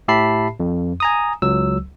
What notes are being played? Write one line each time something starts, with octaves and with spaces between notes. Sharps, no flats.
A2 G4 E5 A5 B5 C7
F2
G#5 A#5 D#6
C#2 F#3 E6